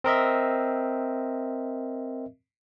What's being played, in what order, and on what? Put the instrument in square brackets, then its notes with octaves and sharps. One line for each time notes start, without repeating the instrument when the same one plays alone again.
[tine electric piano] C4 A#4 D#5 E5